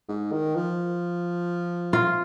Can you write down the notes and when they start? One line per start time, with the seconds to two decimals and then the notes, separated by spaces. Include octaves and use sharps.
0.09 G#2
0.32 D#3
0.56 F3
1.93 F4